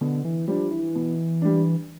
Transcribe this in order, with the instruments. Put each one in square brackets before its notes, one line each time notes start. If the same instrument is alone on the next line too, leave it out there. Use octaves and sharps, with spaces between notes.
[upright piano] B2 [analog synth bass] D3
[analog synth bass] E3
[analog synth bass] F3 [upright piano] G3 D4
[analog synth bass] E3
[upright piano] B2
G3 D4